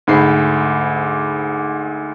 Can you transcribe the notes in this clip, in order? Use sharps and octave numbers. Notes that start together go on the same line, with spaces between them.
D2 G#2 B5 C7